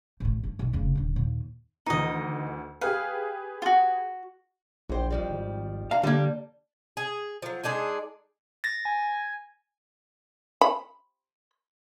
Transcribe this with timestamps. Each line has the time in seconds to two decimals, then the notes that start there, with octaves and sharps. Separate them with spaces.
0.20 A1 A2
0.43 G2
0.59 B1 F#2
0.73 F1 C#3
0.95 D#1 D3
1.16 D#2 A#2
1.86 D2 D#3 E3 D#4 D#5
2.81 G4 G#4 B4 F5
3.62 F4 F#4
4.89 A#1 E2 C5 G5
5.11 F2 F3 G3
5.30 G#1
5.91 D4 F5 A#5
6.03 D3 G3 A#3
6.97 G#4
7.42 F3 F#3
7.64 G#3 D4 D#4 G#4
8.64 A6 A#6
8.85 G#5
10.61 B5